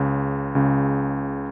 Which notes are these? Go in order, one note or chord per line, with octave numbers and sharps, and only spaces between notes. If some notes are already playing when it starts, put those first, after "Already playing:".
Already playing: C#2 C#3
C#2 C#3